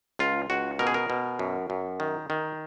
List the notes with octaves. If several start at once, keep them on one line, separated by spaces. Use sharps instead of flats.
C#2 F4
C#2 F#4
B2 A#4
G#4
A#4
B2
F#2
F#2
D#3
D#3